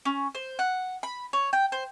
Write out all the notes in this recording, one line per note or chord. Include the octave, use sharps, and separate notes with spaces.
C#4
C5
F#5
B5
C#5
G5
C5